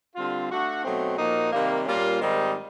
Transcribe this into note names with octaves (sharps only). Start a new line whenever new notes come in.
D3 G3 C4 F4
A3 D4 F#4
B2 F#3 A3 C4 D#4
A#2 F3 A#3 D#4 F#4
C3 D#3 G3 A#3
A#2 G3 A#3 C#4 F4
G#2 D#3 G3 C4 D#4